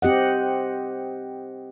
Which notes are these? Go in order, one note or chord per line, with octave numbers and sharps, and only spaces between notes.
C4 G4 D#5 F#5